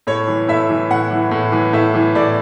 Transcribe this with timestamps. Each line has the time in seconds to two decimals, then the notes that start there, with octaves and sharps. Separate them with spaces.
0.07 A2 C#5
0.28 E3
0.48 A2 E5
0.69 E3
0.90 A2 F#5
1.11 E3
1.31 A2
1.52 E3
1.73 A2 E5
1.94 E3
2.15 A2 D5